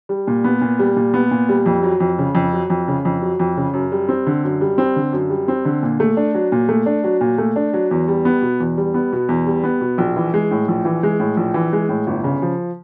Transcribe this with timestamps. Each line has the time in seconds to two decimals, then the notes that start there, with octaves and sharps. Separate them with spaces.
0.09 G3
0.27 A#2
0.44 B3
0.61 A#2
0.79 G3
0.96 A#2
1.14 B3
1.31 A#2
1.49 G3
1.66 F2
1.83 F#3
2.00 F2
2.18 C#3
2.35 F2
2.53 F#3
2.70 F2
2.88 C#3
3.05 F2
3.22 F#3
3.39 F2
3.57 C#3
3.74 F#2
3.92 G3
4.09 C4
4.27 D3
4.44 F#2
4.61 G3
4.78 C4
4.96 D3
5.13 F#2
5.30 G3
5.48 C4
5.65 D3
5.83 A#2
6.00 A3
6.17 D4
6.34 F#3
6.52 A#2
6.69 A3
6.86 D4
7.04 F#3
7.21 A#2
7.38 A3
7.56 D4
7.73 F#3
7.91 E2
8.08 G3
8.25 B3
8.42 B2
8.60 E2
8.78 G3
8.94 B3
9.13 B2
9.29 E2
9.47 G3
9.64 B3
9.81 B2
9.98 A#1
10.16 E3
10.34 G#3
10.51 A2
10.68 A#1
10.85 E3
11.03 G#3
11.20 A2
11.37 A#1
11.54 E3
11.73 G#3
11.89 A2
12.07 G1
12.24 C#3
12.42 F3